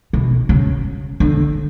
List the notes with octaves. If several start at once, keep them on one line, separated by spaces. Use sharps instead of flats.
B2
C#3
D3